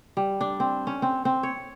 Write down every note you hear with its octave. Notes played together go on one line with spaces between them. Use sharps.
G3
D4
C4
C#4
C4
C4
C#5